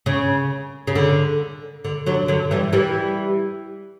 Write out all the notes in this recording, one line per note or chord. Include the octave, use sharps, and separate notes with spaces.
C#3
C#3
D3
D3
D3 F#3
D3 F#3
E3 G3
E3 G3